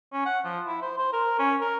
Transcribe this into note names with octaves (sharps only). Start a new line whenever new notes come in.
C#4
F#5
F3
E4
C5
C5
A#4
C#4
A#4